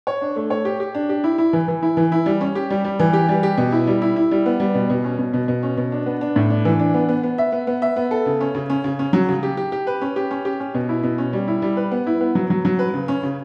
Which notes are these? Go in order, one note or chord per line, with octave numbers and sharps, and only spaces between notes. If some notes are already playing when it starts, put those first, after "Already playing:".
C#5
D4
A3
C#5
G4
G4
D4
G4
E4
E4
E3
E3
E4
E3
E4
G3
C#4
G4
G3
G3
E3
G4
G3
G4
B2
E4
G3
E4
E4
G3
B3
G3
B2
B2
C#4
B2
B2
B2
C#4
B2
D4
B3
D4
A2
D4
E3
D4
B3
B3
B3
E5
B3
B3
E5
B3
A4
C#3
C#4
C#3
C#4
C#3
C#4
F#3
C#3
G4
G4
G4
B4
C#4
G4
C#4
G4
C#4
B2
E4
B2
C#4
G3
E4
G3
B4
B3
E4
B3
F#3
F#3
F#3
B4
C#3
C#4
C#3